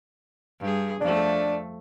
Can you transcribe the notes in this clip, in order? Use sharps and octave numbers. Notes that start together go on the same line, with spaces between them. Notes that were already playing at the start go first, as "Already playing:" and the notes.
G2 G#4
F2 A3 D4